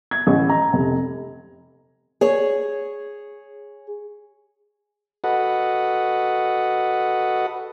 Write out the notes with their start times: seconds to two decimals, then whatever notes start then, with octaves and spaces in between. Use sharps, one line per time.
0.11 G#6
0.27 A1
0.49 A#5
0.73 F1
2.21 G#4 C#5
5.24 F#4 A4 B4 D#5 F#5